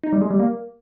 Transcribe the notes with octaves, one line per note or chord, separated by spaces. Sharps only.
D#4
G3
G#3
G3
A#3